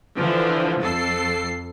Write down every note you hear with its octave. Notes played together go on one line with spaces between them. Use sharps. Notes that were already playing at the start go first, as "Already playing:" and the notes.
D3 E3 F3
F2 A4 C7